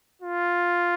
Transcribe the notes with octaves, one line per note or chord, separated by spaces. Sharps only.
F4